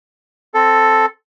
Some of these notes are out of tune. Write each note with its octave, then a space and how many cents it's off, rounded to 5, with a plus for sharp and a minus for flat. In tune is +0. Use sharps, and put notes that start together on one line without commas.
C4 +0 A4 +0